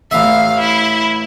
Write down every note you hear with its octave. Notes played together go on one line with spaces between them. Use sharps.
A1 E5 F5
E4